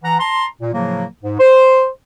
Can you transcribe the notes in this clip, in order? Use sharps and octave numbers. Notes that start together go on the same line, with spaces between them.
E3 F#5 A#5
A5 A#5 C6
A#2
A2 C#3 F3 F#3 A#3
G#2
C5